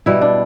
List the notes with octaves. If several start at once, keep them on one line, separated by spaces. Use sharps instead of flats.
B2 G3 E4
D4